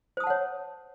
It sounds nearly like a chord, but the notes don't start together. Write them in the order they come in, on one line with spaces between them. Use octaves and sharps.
C5 D#6 A5 F#5 C#5